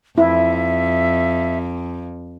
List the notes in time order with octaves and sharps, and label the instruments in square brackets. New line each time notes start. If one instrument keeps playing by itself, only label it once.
[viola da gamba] F2 [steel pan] E4 [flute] E5